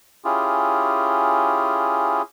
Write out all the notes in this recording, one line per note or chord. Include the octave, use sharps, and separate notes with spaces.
C#4 E4 F4 G4 G#4